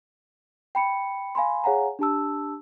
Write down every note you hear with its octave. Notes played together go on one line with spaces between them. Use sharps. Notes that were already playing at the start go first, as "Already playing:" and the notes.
G5 B5 C#7
F5 G#5 B5 C6
G#4 C#5 F5 F#5 G#5 A#5
D4 G4 A5 E6